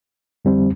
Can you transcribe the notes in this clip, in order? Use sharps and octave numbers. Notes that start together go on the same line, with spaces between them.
F2 D3 G3 C4